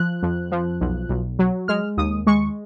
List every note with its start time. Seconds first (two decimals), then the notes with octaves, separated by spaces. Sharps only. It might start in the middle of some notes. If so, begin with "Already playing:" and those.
Already playing: F3 F#6
0.23 F2
0.52 F3
0.81 B1
1.09 B1
1.39 F#3
1.68 G#3 F6
1.97 D#2 D#6
2.27 G#3 C#6